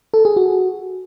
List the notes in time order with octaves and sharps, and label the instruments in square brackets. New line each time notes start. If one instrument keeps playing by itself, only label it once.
[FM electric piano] A4
G#4
F#4